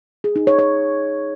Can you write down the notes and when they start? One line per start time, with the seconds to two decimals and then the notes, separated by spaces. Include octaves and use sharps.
0.24 G#4
0.36 D#4
0.47 C#5
0.59 C#5